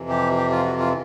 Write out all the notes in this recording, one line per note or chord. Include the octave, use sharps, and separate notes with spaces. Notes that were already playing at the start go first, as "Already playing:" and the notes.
Already playing: F2 C3 E3
G4
G4
F4
F#4
F4